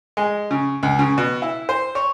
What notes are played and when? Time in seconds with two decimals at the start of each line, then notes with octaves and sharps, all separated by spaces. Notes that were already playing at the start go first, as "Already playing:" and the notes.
0.17 G#3
0.51 C#3
0.83 C#2
0.99 C#3
1.18 B2
1.42 E4
1.69 C5
1.95 C#5